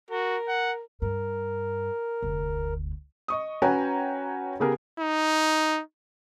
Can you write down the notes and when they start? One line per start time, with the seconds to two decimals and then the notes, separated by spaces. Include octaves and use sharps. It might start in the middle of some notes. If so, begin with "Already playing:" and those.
0.11 F#4 A#4
0.48 F#5
1.02 G2 A#4
2.23 F1 D2
3.28 D#5 C#6 D#6
3.62 C#4 F#4 B4 G5 G#5 A#5
4.60 C#3 B3 G4 G#4 A#4
5.00 D#4